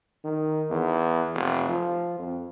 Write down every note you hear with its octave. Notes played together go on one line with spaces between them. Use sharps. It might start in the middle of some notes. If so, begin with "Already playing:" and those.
D#3
E2
F1
F3
F2